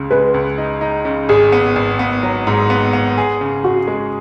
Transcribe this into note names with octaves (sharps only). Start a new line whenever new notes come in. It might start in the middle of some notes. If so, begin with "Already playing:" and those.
Already playing: C#2 C#3
G#3 B4
C#2
D#4
D#4
C#3
G#1 G#4
B3
G#1
B3
F#3
G#2
B3
B3
G#4
C#3
C#3 F#4
G#3